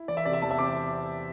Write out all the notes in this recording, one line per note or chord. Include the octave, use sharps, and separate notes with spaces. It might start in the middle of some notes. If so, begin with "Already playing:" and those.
Already playing: E4
E3 D5
E5
C3 D5
E5
E2 A5
E5
C4 D6